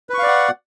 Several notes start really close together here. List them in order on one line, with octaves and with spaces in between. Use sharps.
B4 C#6 F5 D5 F#5